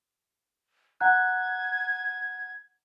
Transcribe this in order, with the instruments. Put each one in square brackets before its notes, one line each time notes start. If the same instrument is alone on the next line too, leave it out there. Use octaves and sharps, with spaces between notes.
[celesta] F#5 A#5 F#6 [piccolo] G#6